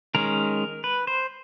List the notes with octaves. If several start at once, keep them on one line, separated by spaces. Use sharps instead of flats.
D#3 G#3 C#4 A#4
B4
C5